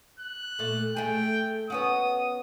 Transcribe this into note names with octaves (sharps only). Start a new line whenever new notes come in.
F#6
A#2 A3
A3 G#4 G5
B3 C#4 F#4 D#6